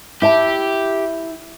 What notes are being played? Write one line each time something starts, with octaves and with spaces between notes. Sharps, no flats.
E4 G4 E5 A5